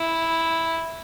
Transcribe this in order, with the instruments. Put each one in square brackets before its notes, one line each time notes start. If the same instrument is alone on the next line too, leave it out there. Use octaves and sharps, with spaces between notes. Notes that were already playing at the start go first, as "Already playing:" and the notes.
Already playing: [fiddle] E4